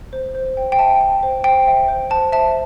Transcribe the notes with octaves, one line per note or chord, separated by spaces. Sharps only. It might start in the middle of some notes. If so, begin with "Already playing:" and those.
C5
C5
G5
G5
E5 A5
G5
C5
C5 G5
E5
C5
C5 A5
E5 A5